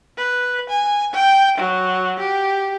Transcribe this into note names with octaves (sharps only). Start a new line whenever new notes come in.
B4
G#5
G5
F#3
G4